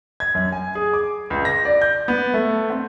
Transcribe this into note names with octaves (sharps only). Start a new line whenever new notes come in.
G#6
F#2
G#5
G#4
D6
C#2
A#6
D5
G6
B3
A3
C4